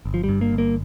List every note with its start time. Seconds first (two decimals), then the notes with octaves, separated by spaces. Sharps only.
0.05 G1
0.14 F3
0.24 G3
0.29 G2
0.41 A#3
0.52 G1
0.58 A#3